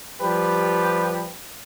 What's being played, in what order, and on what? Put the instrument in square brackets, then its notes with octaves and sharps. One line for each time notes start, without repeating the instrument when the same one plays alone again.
[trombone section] F3 G3 G4 B4